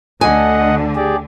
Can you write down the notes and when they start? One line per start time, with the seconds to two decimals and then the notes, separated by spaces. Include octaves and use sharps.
0.21 D2 D3 D#5 F#5 G#5
0.95 G4 G#4 D5